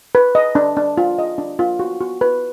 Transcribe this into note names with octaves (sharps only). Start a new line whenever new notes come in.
B4
D#5
D4
D4
F4
D#5
D4
F4
F#4
F#4
B4